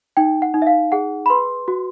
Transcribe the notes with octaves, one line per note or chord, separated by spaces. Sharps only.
D#4 G5
F#5
D#4
E5
F5
G#4 F#5
B5
B4 C6
F#4